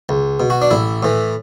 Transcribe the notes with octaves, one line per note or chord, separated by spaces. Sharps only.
C#2
B2
F#4
D4
A1 E4
A2 E3